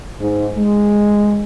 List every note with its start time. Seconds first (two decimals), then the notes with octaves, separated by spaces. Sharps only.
0.19 G#2
0.57 G#3